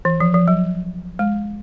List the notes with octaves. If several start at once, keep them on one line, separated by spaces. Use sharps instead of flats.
E3
F3
F3
F#3
G#3